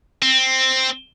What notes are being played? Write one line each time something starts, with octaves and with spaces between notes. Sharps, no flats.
C4